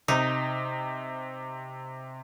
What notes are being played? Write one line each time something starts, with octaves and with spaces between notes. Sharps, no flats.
C3 D#4